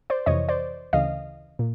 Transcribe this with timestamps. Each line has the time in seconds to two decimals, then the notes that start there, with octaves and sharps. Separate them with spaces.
0.10 C5 D5
0.26 F2 C3 E3 C#5 D#5
0.49 C5 D5
0.93 D2 C#3 E3 D#5 F5
1.59 A#2